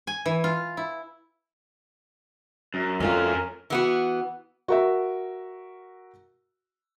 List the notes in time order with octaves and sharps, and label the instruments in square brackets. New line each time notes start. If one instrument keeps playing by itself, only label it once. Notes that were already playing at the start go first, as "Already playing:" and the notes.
[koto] G#5
E3
F4
E4
[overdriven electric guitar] F#2
[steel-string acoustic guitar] F2 A3 F4 [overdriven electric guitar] C#4 A#4
[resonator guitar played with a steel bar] E3 B3 F#4
[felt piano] F#4 A#4 E5